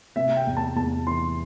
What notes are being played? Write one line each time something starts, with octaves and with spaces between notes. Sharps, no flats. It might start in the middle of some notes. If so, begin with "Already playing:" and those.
C3 E5
G5
E2
A5
E2 A5
E3 C6